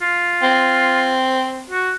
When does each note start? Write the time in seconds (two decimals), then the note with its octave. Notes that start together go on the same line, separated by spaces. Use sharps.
0.02 F4
0.43 C4
1.70 F#4